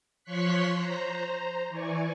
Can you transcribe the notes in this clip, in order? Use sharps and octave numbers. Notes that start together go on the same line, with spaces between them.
F3 C#5 C6 C#6 F#6 B6
C5 A#5
E3 D5 G#5 C#6